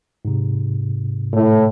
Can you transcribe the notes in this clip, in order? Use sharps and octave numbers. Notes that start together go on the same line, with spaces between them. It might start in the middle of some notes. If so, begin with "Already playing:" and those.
G#2 C3
A2